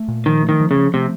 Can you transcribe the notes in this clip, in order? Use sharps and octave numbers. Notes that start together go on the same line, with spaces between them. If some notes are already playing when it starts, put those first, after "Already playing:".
Already playing: A3
A#2
D#3 F3
A3
D#3
F3
C#3
F3
C3 A3